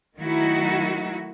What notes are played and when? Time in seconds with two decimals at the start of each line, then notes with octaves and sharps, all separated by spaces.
0.18 D#3 F#3 A3 D#4 E4 F#4